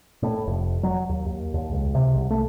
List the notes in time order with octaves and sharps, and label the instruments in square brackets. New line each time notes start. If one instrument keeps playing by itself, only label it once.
[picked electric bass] A2
F1
F#3
D#2
D#2
D#2
C#2
C3
C2
A3